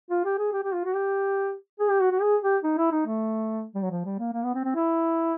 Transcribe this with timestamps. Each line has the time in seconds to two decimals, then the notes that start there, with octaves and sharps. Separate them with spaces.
0.11 F4
0.25 G4
0.39 G#4
0.53 G4
0.63 G4
0.74 F4
0.85 F#4
0.95 G4
1.80 G#4
1.90 G4
2.01 F#4
2.11 F#4
2.22 G#4
2.43 G4
2.64 D#4
2.78 E4
2.92 D#4
3.06 A3
3.75 G3
3.83 F#3
3.91 F3
4.05 G3
4.19 A#3
4.33 A#3
4.43 B3
4.54 C4
4.64 C4
4.75 E4